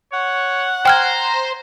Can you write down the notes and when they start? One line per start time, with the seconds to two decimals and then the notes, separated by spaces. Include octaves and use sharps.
0.13 C#5 F#5
0.86 C5 G5 A#5 F6 G#6